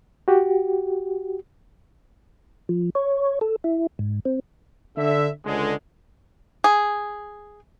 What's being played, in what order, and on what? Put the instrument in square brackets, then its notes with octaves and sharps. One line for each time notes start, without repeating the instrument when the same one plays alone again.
[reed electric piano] F#4 G4
[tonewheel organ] F3
C#5
A4
E4
G#2
C4
[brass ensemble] D3 E5
C#2 D3 G#3
[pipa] G#4